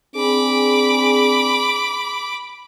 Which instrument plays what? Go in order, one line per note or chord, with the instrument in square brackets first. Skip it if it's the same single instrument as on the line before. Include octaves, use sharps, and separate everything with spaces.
[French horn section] C4 D4 G#4 [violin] B5 D6